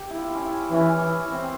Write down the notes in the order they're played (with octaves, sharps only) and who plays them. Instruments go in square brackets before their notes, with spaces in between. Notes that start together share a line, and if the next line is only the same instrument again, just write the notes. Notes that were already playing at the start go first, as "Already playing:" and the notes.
Already playing: [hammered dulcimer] G4
E4
F4
E4
C#4
E4
[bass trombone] E3 [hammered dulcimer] C#4
[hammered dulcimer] E4
C4